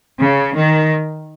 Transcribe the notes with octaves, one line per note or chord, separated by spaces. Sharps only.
C#3
D#3